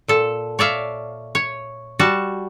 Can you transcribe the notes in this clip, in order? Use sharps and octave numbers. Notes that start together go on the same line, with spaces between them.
A#2 A4
C#5 D5 E5 F5
C#5
G3 F#4 A5